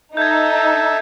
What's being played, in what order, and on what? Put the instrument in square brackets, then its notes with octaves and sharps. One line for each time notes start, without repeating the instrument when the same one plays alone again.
[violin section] D#4 [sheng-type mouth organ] A4 E5 [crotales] G6 G#6